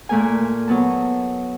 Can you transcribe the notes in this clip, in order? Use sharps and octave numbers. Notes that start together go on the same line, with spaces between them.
A#2 A3 A#3 G#5
F#3 B3 A5